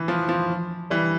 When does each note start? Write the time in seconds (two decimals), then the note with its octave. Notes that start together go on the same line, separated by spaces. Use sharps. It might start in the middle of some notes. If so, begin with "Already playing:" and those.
Already playing: E3
0.08 F3
0.29 F3
0.90 E3 G3